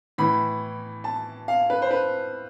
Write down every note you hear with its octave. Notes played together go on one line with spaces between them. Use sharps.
A2 E3 B5
A5
F5
B4
C5
B4